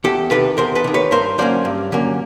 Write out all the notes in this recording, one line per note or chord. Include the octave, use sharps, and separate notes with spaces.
E2 G4 A4
C3 D#3 A4 B4
E2 A#4 C5
A4 B4
C3 D#3
B4 C#5
G2 A#4 C5
D3 F#3 A#3 C#4 C5 D5
G2
D3 F#3 A#3 C#4